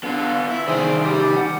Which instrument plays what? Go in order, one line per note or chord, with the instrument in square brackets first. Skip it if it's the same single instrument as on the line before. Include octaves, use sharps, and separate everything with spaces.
[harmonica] D3 [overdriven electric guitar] B3 F4
[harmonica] E4
[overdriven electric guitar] C2 D#3 [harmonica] G#4 C5 D5
[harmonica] G3 D6
[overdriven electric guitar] F#5